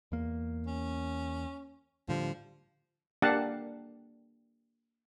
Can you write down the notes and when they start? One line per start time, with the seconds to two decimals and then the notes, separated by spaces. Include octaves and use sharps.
0.12 E2 A#3
0.67 C#4
2.08 A2 D3 F3 G3
3.22 A#3 D4 G4 F5 F#5 A5